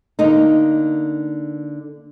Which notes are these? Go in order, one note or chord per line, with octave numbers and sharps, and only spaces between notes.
D3 A#3 D#4